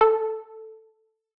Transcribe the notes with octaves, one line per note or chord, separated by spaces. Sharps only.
A4